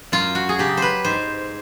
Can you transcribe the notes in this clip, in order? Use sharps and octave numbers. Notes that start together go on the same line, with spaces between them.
F#2 F4
F#4
G#4
C#3 F#3 G4
B4 C5
G#2 C5